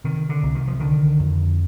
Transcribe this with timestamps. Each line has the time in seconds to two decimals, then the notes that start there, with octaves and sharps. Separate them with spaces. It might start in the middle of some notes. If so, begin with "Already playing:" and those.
0.04 C3 D#3
0.29 D3
0.43 C2
0.55 D#3
0.68 F3
0.80 D3 D#3
1.19 F2